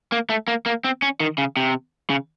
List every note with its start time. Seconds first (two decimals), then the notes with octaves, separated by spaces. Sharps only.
0.12 A#3
0.30 A3
0.48 A#3
0.66 A#3
0.84 C4
1.02 C#4
1.20 D#3
1.38 C#3
1.57 C3
2.10 C#3